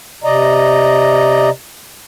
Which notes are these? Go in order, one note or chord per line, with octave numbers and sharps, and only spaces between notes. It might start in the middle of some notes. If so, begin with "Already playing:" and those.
C3 D5 D#5 A#5